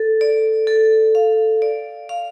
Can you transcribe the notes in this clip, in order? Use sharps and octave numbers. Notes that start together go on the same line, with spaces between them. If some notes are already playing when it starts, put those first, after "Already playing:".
Already playing: A4
D5
A4
F5
D5
F5